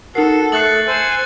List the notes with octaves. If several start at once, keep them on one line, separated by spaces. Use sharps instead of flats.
D#4 F#4 A4 A#4 C7
A3 C#6 D#6 F#6 A6 C7 F#7
C5 G#5 E6 C#7 E7